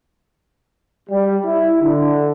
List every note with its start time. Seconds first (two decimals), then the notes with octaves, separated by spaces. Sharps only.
1.09 G3
1.45 E4
1.82 D3